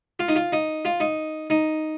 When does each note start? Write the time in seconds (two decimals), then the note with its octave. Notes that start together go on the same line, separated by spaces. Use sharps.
0.19 F4
0.28 D#4
0.36 F4
0.53 D#4
0.85 F4
1.00 D#4
1.50 D#4